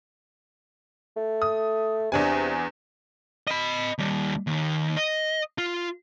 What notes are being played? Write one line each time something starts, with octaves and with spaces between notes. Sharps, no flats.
A3
D#6
E2 C3 D4 G#5
D#5 B5
D#2 G3
D#2 D#3
D#5
F4